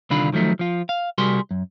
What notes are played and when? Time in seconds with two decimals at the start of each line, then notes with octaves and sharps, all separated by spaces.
0.10 C2 D3 D#3 D4 F4 B5
0.33 D#3 F3 F#3 A3 D#4
0.59 F3 F4
0.89 F5
1.18 C2 G3 F#4 G#4 A#4 C6
1.51 F#2